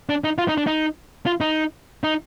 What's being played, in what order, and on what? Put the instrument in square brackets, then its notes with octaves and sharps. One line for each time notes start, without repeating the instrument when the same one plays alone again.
[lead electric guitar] D4
D#4
F4
D#4
D4
D#4
F4
D#4
D#4